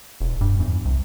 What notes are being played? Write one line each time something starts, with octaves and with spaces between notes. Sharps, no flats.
E1
G2
E2
C2